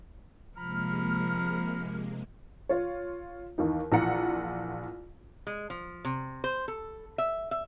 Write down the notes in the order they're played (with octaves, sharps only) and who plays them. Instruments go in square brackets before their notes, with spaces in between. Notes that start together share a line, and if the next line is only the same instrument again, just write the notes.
[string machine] C3 G#3 A#3 [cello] F3 [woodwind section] A#5 B5 F6
[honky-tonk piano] F4 C#5
D#2 E3 D#4
A#1 E3 F4 F#5 A#5 C#7
[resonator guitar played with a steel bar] G#3
F3
C3
C5
A4
E5
E5